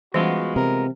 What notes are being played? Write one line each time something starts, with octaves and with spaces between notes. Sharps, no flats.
E3 G3 G#3 B3 C#4 F4 F#4
C3 A#4